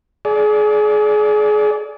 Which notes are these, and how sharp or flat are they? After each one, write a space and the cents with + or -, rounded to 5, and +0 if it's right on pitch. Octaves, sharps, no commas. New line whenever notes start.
G#4 +30 D5 -20